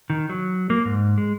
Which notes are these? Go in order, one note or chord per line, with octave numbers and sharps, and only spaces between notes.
D#3
F#3
A#3
G#2
G#3